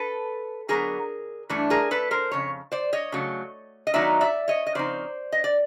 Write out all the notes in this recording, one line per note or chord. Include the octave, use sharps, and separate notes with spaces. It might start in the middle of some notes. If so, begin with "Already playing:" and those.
Already playing: A4 B4
D3 F#3 B3 G#4 A#4
G2 E3 A3 D4
G#4 A#4
A4 B4
A#4 C5
F2 C#3 C#5
C5 D5
C#5 D#5
C#3 F#3 A3
D#5
D#3 F#3 B3 D#4 D5 E5
D5 E5
C#5 D#5
D#5
C#3 F3 C4 D#4 C5 D5
D#5
D5